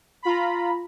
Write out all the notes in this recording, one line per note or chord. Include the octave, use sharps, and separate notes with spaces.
F4 A#5 B5